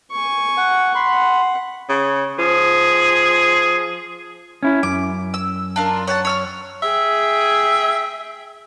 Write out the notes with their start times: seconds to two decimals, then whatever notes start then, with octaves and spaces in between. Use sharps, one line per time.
0.12 G#5 C#6
0.57 F#5
0.95 F#5 B5 C6
1.89 C#3
2.38 F3 G#4
4.63 C#4 E4
4.83 F#2 D6
5.34 E6
5.76 D4 F4 A#4
6.08 C#5 F#5 A5
6.25 C#5 E6 F6
6.83 G#4 E5 G5